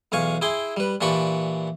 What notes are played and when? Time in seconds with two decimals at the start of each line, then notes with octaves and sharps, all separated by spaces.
0.12 B1 E2 F5 G#5 C#6
0.42 E4 G#4 G5 C6
0.77 G3 B4
1.01 A#2 E3 D4 G4 B5 C#6